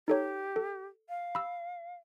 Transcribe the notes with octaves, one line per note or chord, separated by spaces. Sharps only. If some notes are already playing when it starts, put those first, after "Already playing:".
D#4 G4 A4 C#5
A4
F5
B5 E6